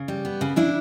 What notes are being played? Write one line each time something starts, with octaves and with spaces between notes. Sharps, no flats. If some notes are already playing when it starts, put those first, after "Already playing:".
Already playing: C#3
G3
B3
C#3
C#3 D4 E4